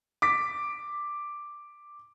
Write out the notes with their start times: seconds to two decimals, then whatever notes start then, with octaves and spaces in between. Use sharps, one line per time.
0.22 D6 B6